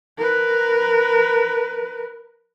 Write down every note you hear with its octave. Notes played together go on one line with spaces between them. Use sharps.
A#4 B4